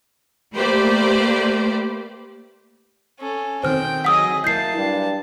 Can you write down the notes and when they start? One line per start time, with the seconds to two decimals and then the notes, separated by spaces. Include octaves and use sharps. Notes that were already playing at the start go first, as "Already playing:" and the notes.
0.55 A3 A#3 G4 B4 C5 D5
3.20 C#4 A4
3.64 B2 D#3 C4 C5 G5 F6
4.05 F#3 G#4 D#5 F#5 D#6 E6
4.44 F#3 A#3 E4 A5 G6 C7
4.76 G2